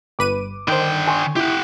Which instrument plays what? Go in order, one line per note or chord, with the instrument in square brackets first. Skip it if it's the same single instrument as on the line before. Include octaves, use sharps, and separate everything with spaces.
[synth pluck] G1 B4 D#7 [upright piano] D6
[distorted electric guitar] D3 G5 [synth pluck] D#3 C5
[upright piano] G#5 C6 C#6
[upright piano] E4 [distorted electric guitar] G4 F#5